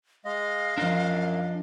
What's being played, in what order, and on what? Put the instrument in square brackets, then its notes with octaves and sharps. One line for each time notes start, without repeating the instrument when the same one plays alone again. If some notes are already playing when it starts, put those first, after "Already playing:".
[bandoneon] G#3 D#5 [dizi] F5
[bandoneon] F#2 [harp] F3 E7 [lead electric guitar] D4 D#5